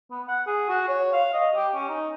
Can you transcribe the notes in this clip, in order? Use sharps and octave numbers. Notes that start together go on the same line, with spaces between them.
B3
F#5
G#4
F#4
C#5
F5
D#5
G4
C#4
D#4